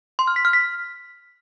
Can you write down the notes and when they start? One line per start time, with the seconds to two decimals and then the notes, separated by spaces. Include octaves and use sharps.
0.19 C6
0.27 F6
0.36 B6
0.45 F6
0.53 B6